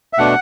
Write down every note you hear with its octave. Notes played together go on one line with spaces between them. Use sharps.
E5
B2 A3 D4 F#5